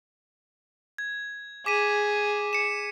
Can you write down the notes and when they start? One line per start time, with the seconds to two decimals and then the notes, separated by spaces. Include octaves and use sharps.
0.98 G#6
1.66 G#4 D6 B6 D#7
2.53 C#7 E7